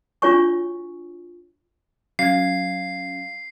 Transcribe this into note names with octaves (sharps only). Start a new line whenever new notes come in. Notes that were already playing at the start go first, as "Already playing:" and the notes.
D4 F4 F#4 C#5 G#5 C#6
F#3 C#4 F5 G#6 C7